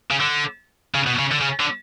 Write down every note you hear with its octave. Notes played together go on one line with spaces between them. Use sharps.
C#3
D3
C#3
B2
C#3
D3
C#3
D3